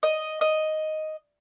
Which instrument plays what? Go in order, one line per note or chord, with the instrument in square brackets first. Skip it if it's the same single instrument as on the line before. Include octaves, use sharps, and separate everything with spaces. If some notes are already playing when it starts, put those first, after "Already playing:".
[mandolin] D#5
D#5